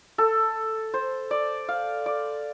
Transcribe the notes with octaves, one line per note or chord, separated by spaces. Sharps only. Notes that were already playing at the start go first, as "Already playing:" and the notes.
A4
C5
D5
F5
D5